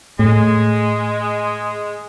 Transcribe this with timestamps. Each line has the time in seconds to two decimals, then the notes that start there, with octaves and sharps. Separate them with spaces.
0.19 A2 G#3